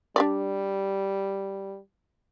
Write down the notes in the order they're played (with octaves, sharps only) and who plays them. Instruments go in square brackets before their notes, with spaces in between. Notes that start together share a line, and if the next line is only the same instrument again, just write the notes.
[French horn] G3 [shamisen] D4 G4 D5